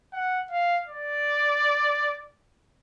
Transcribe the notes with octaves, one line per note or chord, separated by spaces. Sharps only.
F#5
F5
D5